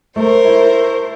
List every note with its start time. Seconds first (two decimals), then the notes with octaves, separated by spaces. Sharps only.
0.16 A3 A#4 C5
0.44 E4